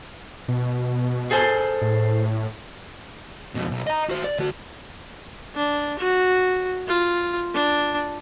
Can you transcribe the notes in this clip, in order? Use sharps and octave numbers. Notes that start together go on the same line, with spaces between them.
B2
G#4 A4 C5
A2
F2 B2
B1
D#5 A#5
F#4 C5
D5
D3 F#4
D4
F#4
F4
D4